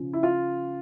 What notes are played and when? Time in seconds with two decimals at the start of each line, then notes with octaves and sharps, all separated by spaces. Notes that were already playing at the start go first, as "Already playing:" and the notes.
Already playing: C#3 F3
0.13 E4
0.23 F4